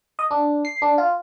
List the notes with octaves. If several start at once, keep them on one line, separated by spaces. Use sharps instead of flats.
D#5
D4
C7
D4
F4